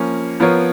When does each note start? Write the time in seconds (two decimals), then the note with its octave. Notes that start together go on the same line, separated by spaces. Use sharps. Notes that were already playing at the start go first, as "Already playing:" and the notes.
Already playing: F3 A#3 C#4
0.40 F3 B3 F4 A#4 C#5